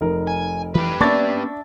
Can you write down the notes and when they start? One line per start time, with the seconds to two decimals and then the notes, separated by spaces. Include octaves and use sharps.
0.01 F1 D#4 A#4
0.27 G#5
0.75 E3 G4 B4
1.01 A#3 B3 C#4 D4 E5 C#6 D6 A6